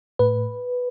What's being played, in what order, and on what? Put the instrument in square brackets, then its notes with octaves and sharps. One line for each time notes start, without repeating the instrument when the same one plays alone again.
[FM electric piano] A2 B4